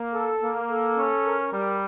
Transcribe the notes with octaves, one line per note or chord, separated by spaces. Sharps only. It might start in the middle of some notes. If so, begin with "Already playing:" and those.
Already playing: A#3
A4
A#3
A4
C#4
A#4
G3